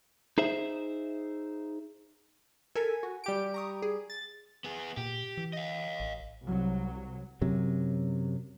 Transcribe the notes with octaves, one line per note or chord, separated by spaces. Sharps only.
D#4 G#4 C5 E5
A4 A#4 G#5 B6
F#4
G3 G4 D7
A#5 C#6 D#6
G#4
A6
B3 G#4
A#2 G4
E3
D#5 F5
A1
C2 F#3
F#2 C3 F#3